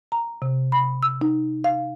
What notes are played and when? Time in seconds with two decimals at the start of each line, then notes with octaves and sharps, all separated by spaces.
0.12 A#5
0.42 C3
0.72 B5
1.03 E6
1.21 D#4
1.64 F5